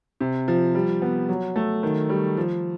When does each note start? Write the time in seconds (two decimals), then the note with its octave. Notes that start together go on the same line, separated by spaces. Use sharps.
0.21 C3
0.48 F3
0.75 G3
1.02 B3
1.29 F#3
1.56 A3
1.83 D#3
2.09 G3
2.37 F3